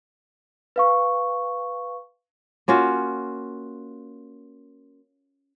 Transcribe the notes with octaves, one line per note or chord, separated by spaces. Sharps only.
B4 F5 C#6
A#3 C#4 F4 F#4